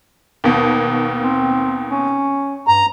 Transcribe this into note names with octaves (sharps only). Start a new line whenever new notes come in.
D#2 B2
C4
C#4
G2 A#5